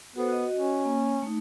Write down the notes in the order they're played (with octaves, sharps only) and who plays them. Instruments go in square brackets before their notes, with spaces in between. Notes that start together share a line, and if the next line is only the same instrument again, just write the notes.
[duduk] B3 [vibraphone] F#4 A4 C5
[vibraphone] F#4 D#5
[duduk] C#4
[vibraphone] A#3
A3 D#4